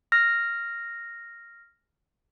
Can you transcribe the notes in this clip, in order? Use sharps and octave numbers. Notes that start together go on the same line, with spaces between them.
F6 A#6